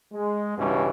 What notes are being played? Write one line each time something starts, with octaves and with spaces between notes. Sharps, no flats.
G#3
C#2 G2 B2 E3 C#4